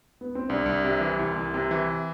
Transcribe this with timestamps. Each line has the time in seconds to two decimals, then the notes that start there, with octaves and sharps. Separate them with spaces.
0.21 B3
0.35 C4
0.49 C2 D4
0.66 C2
0.84 C3
1.01 E3
1.19 C2 E4
1.36 C2
1.54 C3
1.71 E3